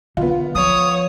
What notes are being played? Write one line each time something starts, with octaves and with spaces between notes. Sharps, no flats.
D3 B3 F4
F3 C#5 D#6